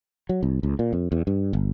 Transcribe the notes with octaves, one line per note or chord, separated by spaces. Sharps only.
F#3
C2
C#2
A#2
F2
E2
G2
G1